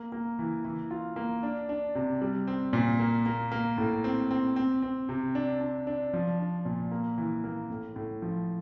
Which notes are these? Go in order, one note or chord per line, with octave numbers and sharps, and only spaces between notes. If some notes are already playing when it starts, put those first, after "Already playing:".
Already playing: A#3
A#3
E3
E3
F4
A#3
D4
D4
C3
G3
C4
A#2
A#3
A#3
A#3
A2
C4
C4
C4
C4
C3
D4
D4
D4
F3
D4
A#2
A#3
E3
A#3
A2
A2
F3